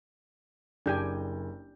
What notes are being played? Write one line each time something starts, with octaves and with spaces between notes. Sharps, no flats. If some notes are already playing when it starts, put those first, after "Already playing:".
F#1 D4 G4 G#5 G6